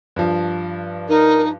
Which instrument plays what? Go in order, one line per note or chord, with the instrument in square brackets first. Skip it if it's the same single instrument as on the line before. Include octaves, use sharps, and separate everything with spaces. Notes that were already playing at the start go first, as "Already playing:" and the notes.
[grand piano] G2 F3
[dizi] D#4 [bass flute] A#4